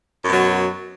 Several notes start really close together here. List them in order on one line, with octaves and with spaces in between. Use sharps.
F#2 B2 F#3